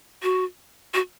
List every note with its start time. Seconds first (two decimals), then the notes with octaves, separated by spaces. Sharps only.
0.23 F#4
0.94 F#4